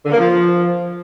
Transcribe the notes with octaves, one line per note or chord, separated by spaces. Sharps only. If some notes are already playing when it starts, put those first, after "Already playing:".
D3
A#3
F3